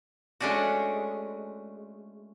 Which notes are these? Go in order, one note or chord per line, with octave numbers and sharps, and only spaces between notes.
G#3 A3 C#4 D4 F#4